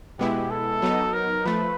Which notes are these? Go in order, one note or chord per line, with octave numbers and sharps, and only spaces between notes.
B2 G#3 B3 E4 G4
A4
F#3 B3 D#4
A#4
F3 A3 B4